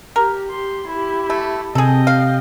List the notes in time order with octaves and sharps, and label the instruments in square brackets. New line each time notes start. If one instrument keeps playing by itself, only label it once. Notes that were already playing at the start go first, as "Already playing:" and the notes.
[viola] G4 [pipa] A#4
[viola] G4 C6
E4 G4
[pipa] A3
[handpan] C3 [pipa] G#4 A4 [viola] D#5 G5
[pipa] F5